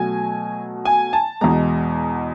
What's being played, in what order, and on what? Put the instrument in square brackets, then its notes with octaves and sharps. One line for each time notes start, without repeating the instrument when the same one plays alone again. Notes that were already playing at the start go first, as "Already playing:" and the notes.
Already playing: [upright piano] B2 F#3 A3 G#5
G#5
A5
E2 B2 G#3 A#5